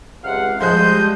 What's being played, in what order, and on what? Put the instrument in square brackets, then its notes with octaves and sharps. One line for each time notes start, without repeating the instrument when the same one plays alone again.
[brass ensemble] C#2 C3 F#5 [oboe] F5
[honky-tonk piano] F3 G#3 F#6 [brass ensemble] G3 D#5 [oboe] C5 [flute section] G6